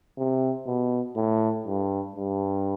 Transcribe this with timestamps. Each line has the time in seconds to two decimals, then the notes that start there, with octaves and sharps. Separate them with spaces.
0.18 C3
0.66 B2
1.16 A2
1.66 G2
2.16 G2